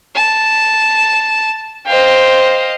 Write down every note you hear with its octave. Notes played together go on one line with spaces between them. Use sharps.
A5
C5 D#5 F5 G5